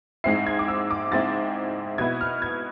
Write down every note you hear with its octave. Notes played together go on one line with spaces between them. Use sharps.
G#2 G#3 C4 E4 C7
G#6
D6
E6
D6
G#2 G#3 C4 E4 A6
B2 B3 E4 G#6
F6
G#6